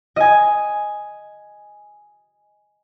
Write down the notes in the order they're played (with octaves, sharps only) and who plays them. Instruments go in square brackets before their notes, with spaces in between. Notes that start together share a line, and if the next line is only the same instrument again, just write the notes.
[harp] D#5 G#5